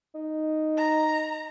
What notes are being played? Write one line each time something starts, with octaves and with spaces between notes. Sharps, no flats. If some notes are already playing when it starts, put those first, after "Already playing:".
D#4
A#5